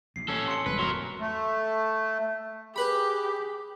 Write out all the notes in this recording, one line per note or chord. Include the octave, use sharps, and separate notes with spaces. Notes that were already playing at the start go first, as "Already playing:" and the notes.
A#1 D#2 C7
A1 C#4 A4
C6 C#7
E1 C2 G2 B4
G#2 F#3 A#4 C6
A3
G4 G#4 B4 B5